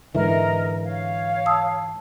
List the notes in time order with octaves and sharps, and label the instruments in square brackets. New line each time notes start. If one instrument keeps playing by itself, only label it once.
[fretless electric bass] G#2 D3 E3 [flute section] A#4 D#5 [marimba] B4 E5
[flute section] C#5 F5
[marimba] A5 D#6 E6